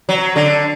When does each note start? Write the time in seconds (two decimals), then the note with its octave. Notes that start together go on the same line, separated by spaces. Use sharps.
0.09 F#3
0.36 D3